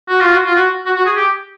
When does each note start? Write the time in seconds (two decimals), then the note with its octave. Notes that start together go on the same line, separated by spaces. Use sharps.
0.09 F#4
0.21 F4
0.32 F#4
0.46 F4
0.55 F#4
0.86 F#4
0.96 F#4
1.06 G#4
1.16 G4